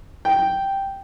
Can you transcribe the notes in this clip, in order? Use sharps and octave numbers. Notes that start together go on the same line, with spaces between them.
G5